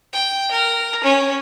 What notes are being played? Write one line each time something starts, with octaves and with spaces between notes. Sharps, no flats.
G5
A#4
C#4